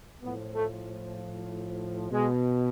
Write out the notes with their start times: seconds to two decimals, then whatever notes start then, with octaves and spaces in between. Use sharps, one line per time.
0.22 A2 F3 B3
0.54 A3
2.11 B2 G#3